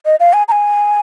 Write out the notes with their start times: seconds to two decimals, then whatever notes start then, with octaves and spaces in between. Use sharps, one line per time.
0.06 D#5
0.20 F5
0.33 G#5
0.48 A#5
0.52 G#5